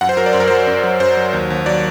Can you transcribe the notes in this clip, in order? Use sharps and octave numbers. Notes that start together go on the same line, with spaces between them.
F#2 F#5
C5
F#3 A#4
D5
F#2 C5
A#4
F#3 C5
F#2
F#3
F#2 C5
F#3
D#2
D#2
F#3 D5